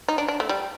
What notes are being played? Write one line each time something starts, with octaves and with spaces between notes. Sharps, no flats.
D#4
D4
D4
A3
G3